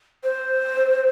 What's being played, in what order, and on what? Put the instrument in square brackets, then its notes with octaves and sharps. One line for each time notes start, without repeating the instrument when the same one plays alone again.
[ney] C5